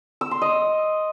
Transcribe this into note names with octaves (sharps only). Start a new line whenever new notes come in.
E6
C6
D#5